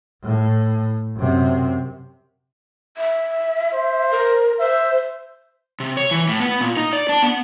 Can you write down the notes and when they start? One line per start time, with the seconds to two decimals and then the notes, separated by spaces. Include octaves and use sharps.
0.23 A2
1.17 F#2 C3
2.97 E5
3.74 C5
4.11 A#4
4.59 C5 E5
5.80 C3
5.97 C#5
6.11 E3
6.29 A2
6.40 B3
6.61 A#2
6.77 D#4
6.93 D5
7.09 D4
7.23 B3